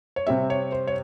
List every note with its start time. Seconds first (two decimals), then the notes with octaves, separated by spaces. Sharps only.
0.16 C#5
0.27 C3 G3 C4 E5
0.50 C#5
0.72 C5
0.87 C#5